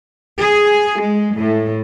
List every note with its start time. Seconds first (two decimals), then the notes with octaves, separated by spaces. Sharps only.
0.39 G#4
1.00 G#3
1.38 A2